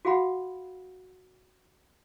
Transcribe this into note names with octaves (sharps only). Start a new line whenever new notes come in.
F#4 G#4 F5 F#5 B5